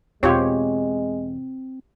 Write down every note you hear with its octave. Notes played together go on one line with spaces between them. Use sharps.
E2 B2 G#3 C4 F4 G4 C#5